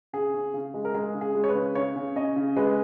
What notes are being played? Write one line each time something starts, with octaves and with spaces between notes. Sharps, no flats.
C#3 G#4
C#4
C#3
G#3
A#4
G#3 G#4
C#3
G#4
G#3
C#5
B4
C#3
C#3 C#5
C#3
C#4 D#5
C#3
G#3 B4